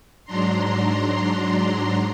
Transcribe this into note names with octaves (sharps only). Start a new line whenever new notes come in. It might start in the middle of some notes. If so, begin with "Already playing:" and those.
G#2 F#3 D4 A#5 C6